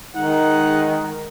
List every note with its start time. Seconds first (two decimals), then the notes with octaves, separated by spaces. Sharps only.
0.16 D#3 G#3 D#4 F#5